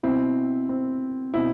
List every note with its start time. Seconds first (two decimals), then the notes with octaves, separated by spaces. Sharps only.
0.03 B2 C4 E4
0.69 C4
1.34 B2 C4 E4